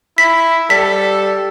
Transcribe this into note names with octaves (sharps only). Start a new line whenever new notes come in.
E4 B6
G3 A4 B6